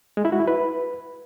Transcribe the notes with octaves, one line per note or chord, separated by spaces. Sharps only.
G#3
E4
F#4
E4
B4